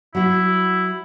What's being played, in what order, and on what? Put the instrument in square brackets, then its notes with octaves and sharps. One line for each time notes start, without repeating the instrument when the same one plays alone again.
[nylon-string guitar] F#3 F#4 [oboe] E4